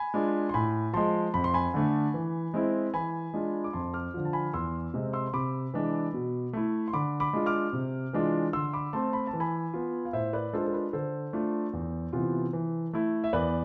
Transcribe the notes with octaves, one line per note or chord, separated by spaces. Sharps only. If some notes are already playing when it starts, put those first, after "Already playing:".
Already playing: G#5 B5
G#3 D4 F4
C6
A2 G#5 B5
F3 G#3 A5 C6
F2 B5
C6
G#5 B5
D3 A3 D4
E3
G#3 C4 E4
E3 G#5 B5
G#3 D4 F4
D6
F2 A5 C6
D6 F6
D3 F3
A5
G#5 B5
E2 C6 E6
C3 G#3 C4
C6 E6
C6
C3 B5 D6
E3 G#3 D4
B2
A3 E4
C6
D3 B5 D6
B5 D6
G#3 D4 F4
D6 F6
C3
E3 G#3 D4 F4
D3 C6 E6
B5 D6
A3 C4 A5 C6
B5
A5
E3
G#5 B5
B3 F4
F5
A2 C5 E5
B4 D5
G#3 D4 F4 A4 C5
A4
B4
D3 A4 C5
A3 D4 F4
E2
C3 E3 B3 F4
E3
A3 E4
E5
E2 B4 D5